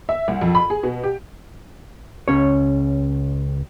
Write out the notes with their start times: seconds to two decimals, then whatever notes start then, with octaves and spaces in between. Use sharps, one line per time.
0.09 E5
0.28 C2
0.42 F2
0.55 B5
0.70 G#4
0.83 B2
1.04 G4
2.28 C#2 C#4 C#5